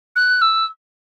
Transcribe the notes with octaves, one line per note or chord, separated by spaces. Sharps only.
F#6
E6